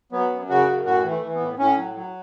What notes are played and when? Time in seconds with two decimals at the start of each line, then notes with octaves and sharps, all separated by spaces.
0.12 F#3 B3
0.31 F#2
0.49 C#3 F#4
0.68 F#2
0.85 A2 F#4
1.04 E3
1.10 A3
1.22 E3
1.35 B3
1.40 A2
1.59 A2 C#4
1.77 F#3
1.95 F#3